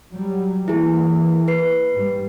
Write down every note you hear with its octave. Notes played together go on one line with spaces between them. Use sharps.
F#3 G3
E3 A#3 E4 G#4
B4 C7
G#2 G3